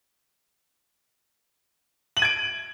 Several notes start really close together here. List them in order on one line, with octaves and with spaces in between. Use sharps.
F#7 D#7 G#6 D7